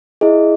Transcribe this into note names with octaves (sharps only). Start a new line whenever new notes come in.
E4 G#4 D#5